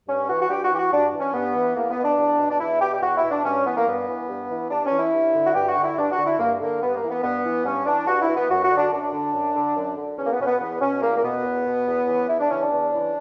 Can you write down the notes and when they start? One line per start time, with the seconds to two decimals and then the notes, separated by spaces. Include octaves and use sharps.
0.07 G2 C#4
0.29 E3 F#4
0.41 F#4
0.49 G2 G4
0.64 F#4
0.71 E3 G4
0.77 F#4
0.92 G2 D4
1.13 E3
1.19 C#4
1.34 G2 B3
1.54 E3
1.76 E2 A#3
1.90 B3
1.97 B2
2.04 D4
2.18 E2
2.39 B2
2.50 D4
2.60 E2 E4
2.81 B2 G4
2.93 G4
3.02 E2 F#4
3.17 E4
3.23 B2
3.31 D4
3.45 G2 C#4
3.65 E3 B3
3.77 A#3
3.87 G2 B3
4.08 E3
4.29 G2
4.50 E3
4.70 G2 D4
4.85 C#4
4.91 E3
4.99 E4
5.13 G2
5.34 D3
5.46 F#4
5.55 G2 G4
5.68 F#4
5.76 D3
5.84 E4
5.97 G2 D4
6.11 F#4
6.19 D3
6.25 E4
6.39 G2 A#3
6.60 D3 A#3
6.81 G2 B3
6.95 A#3
7.03 E3
7.10 B3
7.23 G2 B3
7.45 E3
7.65 G2 C#4
7.86 E3 D4
8.08 G2 F#4
8.22 E4
8.29 E3
8.36 B3
8.50 F#2 F#4
8.63 F#4
8.71 D3
8.77 D4
8.92 F#2 D4
9.13 D3
9.34 F#2
9.55 D3
9.76 F#2
9.97 D3
10.17 E2 C#4
10.26 A#3
10.32 B3
10.39 B2 C#4
10.46 B3
10.60 E2 B3
10.81 B2 C#4
11.02 E2 A#3
11.17 A#3
11.23 B2 B3
11.45 E2
11.66 B2
11.87 E2
12.07 C#3 E3
12.28 E2 E4
12.39 D4
12.50 C#3 E3 C#4
12.62 D4
12.71 E2
12.92 C#3 E3